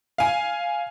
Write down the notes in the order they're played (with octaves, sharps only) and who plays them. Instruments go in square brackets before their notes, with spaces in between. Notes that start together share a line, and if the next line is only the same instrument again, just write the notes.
[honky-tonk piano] F5 G#5